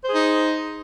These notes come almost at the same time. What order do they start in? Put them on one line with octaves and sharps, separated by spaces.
C5 G#4 D#4